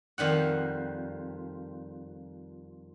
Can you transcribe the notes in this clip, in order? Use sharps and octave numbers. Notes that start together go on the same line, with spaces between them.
F2 D#3 G3 F#5